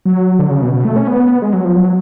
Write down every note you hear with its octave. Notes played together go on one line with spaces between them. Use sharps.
F#3
D3
C#3
B2
B2
A3
C#4
B3
G#3
F#3
F3
F#3